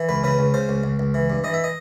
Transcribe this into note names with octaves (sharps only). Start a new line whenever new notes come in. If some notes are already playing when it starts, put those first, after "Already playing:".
Already playing: E3
C#2 B4
C#3 B4
C#2
C#3 C5
C#2
C#2
C#2
E3
G2
E3 D#5
E5
D#5